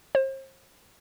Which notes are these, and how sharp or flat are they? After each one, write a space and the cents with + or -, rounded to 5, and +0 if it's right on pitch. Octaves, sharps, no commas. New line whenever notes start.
C5 +40